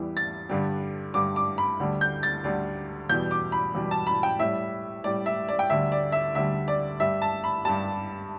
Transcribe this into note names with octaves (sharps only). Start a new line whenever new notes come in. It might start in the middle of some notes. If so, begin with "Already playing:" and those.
Already playing: E2 E3 G3
A6
G2 D3 G3
G2 D3 G3 D6
D6
B5
D2 D3 G3
G6
A6
D2 D3 G3
E2 B2 G3 G6
D6
B5
E2 B2 G3
A5
B5
G5
A2 G3 E5
A2 G3 D5
E5
D5
G5
D2 D3 G3 E5
D5
E5
D2 D3 G3 E5
D5
G2 G3 E5
A5
B5
G2 G3 A5